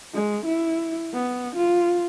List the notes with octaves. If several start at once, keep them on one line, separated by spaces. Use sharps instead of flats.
G#3
E4
B3
F4